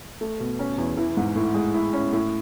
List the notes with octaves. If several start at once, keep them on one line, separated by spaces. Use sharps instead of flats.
A3
B2
C#4
E2
E3
G#2
A2
G#3
E4
C#4
A2